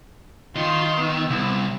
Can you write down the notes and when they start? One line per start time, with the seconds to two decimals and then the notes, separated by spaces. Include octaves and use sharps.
0.56 D#3 F4 C6
0.96 B3 E6
1.30 C2